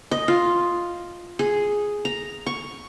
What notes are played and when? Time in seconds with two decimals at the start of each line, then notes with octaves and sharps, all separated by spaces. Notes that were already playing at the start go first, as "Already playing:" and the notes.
0.11 D#5
0.28 F4
1.39 G#4
2.05 A#5
2.46 C#6